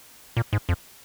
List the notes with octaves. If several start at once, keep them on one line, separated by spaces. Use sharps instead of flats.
A#2
G#2
F2